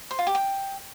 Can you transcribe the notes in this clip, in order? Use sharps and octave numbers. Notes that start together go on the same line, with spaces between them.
C5
F4
G4
G5